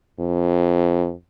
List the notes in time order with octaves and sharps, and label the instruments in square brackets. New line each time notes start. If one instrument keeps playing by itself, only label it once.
[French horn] F2